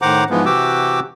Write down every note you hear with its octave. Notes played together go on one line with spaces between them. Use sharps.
A2 D#3 C5 F#5 A#5 D6
G#2 E3 F3 G#3 B3
C3 E3 F#4 G4 D6 E6